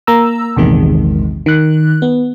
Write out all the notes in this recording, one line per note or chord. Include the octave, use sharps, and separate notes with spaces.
A#3 A#5 E6
A#1 E2 C3 D#3 G#3
D#3 F#6
B3